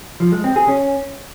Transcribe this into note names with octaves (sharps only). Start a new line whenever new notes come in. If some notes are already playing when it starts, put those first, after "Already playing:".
F3
G#3
C4
G#4
C#4